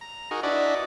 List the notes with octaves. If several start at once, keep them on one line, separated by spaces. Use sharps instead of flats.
A#5
D#4 F#4 G#4 A#4
D4 E4 F#4 B4 D5 D#5